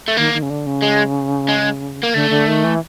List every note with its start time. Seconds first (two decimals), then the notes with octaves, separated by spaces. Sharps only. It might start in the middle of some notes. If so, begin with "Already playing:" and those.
0.08 A3
0.17 D#3 A#3
0.33 D#3
0.42 C#3
0.50 D3
0.67 C#3
0.83 G#3
1.48 G#3
2.03 A#3
2.14 D3 A3
2.30 D3
2.47 D#3
2.64 E3